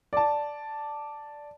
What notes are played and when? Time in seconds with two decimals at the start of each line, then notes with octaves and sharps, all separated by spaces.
0.13 D5 A5